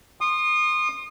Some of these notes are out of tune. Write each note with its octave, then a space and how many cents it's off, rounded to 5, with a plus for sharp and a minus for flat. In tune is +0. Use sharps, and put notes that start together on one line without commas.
C6 +25 D#6 -25